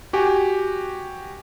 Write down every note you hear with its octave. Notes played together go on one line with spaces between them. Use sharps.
F#4 G4 G#5